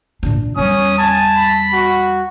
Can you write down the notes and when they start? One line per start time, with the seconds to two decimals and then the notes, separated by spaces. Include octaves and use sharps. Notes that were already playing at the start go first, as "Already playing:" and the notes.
0.23 A#2 D4
0.57 E2 G3 C#4 D#6
0.98 G#5 A5
1.37 B5
1.73 F#4